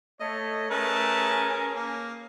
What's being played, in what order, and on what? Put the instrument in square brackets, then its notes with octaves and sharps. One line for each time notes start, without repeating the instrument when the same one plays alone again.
[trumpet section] A3 A4 C#5 [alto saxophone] D#5
[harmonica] A3 B4 A5 [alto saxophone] C#4 [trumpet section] G#4 A#4
[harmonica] A#3